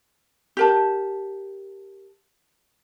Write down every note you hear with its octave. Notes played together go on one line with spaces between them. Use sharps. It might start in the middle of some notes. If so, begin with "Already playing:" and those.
G4 A#4 A5